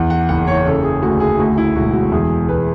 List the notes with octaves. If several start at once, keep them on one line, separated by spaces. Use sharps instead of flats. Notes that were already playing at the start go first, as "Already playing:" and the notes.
Already playing: E2 F#5
F#5
F#1 F#5
C#5
C#3 A4
G#4
D2 F#4
G#4
D2 F#4
E4
E1 F#4
F#4
E2 G#4
E1 B4